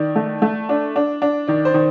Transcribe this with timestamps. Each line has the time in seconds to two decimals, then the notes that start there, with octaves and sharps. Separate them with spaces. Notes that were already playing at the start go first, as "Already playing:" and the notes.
Already playing: D#3 D5
0.16 A3
0.42 A3
0.69 D4
0.96 D4
1.22 D4
1.48 D#3 D5
1.65 C5
1.74 D#3